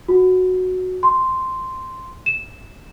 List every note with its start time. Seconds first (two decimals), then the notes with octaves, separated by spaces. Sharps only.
0.09 F#4
1.03 C6
2.26 E7